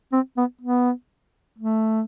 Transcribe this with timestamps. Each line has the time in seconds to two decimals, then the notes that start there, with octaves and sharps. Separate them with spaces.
0.13 C4
0.37 B3
0.61 B3
1.59 A3